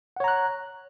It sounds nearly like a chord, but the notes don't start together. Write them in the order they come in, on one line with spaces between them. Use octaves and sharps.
F#5 C#5 A#5 F#6